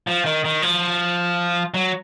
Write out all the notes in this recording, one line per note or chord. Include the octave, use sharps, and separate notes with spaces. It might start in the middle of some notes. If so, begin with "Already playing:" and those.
F3
D#3
D#3
F3
F#3